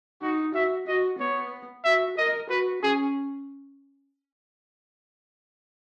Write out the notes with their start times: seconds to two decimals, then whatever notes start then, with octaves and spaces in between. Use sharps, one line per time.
0.22 D#4 F#4
0.55 F#4 E5
0.87 F#4 D#5
1.19 B3 C#5
1.84 F#4 E5
2.18 A#4 D#5
2.50 F#4 B4
2.83 C#4 G#4